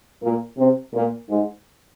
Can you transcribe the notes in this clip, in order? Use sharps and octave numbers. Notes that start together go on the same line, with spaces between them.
A#2 A#3
C3 C4
A#2 A#3
G#2 G#3